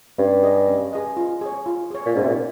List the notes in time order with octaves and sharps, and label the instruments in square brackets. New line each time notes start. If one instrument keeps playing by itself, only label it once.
[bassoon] G2 [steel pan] C#4
[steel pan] G#4 D#5
C#4
G#4 D#5
F4
G#4 C#5
F4
G#4 C#5
[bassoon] A#2
[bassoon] G#2 [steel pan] C#4
[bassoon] C3
A#2